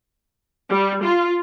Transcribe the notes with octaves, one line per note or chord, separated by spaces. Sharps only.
G3
F4